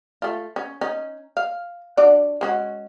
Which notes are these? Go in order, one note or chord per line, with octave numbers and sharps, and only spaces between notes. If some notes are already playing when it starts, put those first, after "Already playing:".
A3 F4
C#4
C#4 D#4
F5
D4 F#4 D5
G#3 C#4 F#4